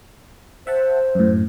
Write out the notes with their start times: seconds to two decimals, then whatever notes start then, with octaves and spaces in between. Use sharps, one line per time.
0.67 C5 E5 F#5 A5
1.15 F#2 A2